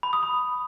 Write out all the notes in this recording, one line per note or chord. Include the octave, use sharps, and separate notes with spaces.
B5
D#6
B5